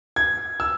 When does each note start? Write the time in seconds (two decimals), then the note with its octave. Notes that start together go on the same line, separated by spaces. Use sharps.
0.16 G#6
0.60 E6